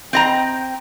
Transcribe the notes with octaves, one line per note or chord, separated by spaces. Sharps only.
C4 D#5 G5 A#5